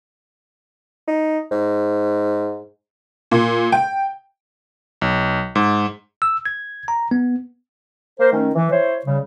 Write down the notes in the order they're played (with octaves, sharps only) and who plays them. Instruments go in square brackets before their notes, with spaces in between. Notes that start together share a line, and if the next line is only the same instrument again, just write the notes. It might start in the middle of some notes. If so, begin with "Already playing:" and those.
[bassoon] D#4
G#2
[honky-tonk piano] A#2
G5
[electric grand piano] B1
G#2
[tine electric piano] E6
G#6
A#5
B3
[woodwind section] A#3 A#4 C5
D#3 A3 C#4
E3
E4 C5 C#5
C#3 G3